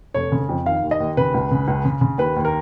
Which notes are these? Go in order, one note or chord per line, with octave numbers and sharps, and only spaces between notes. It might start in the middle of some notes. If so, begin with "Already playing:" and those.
F1 C#5
C#3
F2
D#3 F5
D#2
D#5
D#2
C#3 B4
C#2
C#3
C#2
C#3
C#3
D#2 B4
D#2
A#4